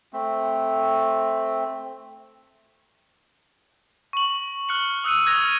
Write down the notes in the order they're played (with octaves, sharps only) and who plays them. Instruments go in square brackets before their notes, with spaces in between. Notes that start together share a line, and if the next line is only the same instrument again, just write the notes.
[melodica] A3 C4
[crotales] C#6 F#7
F6 F#6 C#7 F#7
D#6 E6 F#6 C#7 D#7
F6 F#6 G#6 A#6 F7 F#7
F6 D#7